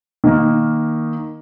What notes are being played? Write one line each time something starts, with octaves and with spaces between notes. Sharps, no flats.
D#3 A#3